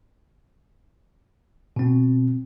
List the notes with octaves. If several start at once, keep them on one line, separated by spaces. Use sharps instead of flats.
B2 C4